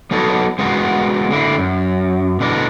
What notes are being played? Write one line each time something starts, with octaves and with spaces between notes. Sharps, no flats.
F#3 B3 D#4 A4 C#5
G#3 B3 F4 F#4 A#4
D3 A#3 E4
F#2
B2 D3 E3 D4 A#4